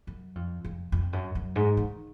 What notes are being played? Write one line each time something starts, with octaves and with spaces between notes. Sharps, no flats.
F#2
F2
F2
F2
F#2
F#2
G#2
D#3